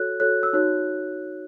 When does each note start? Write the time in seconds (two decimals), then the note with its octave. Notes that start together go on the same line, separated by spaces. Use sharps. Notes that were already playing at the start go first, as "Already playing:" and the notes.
Already playing: F#4 A4 C#5 F#6
0.20 F#4 A4 C#5 F#6
0.43 E6
0.53 D#4 F#4 C#5 F#6